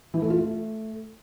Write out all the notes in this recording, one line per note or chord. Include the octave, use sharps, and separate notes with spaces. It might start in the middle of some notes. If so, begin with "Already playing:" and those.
E3
A3
F4
A3